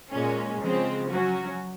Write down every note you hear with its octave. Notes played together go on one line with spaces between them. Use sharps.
A#2 G#3 C#4
C#3 F3 G#3 C4
F#3 C#4 F#4